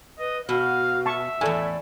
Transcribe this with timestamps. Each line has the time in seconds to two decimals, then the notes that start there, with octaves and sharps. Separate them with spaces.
0.19 B4 D#5
0.49 B2 F#4 F5
1.06 E5 A5 C#6
1.41 E2 A2 A4 D5 G#5